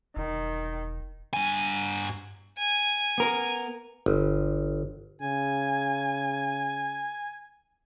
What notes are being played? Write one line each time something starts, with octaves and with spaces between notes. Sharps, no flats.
E1 D#3
G2 G#5
G#5
B3 A#4
G1
C#3 G#5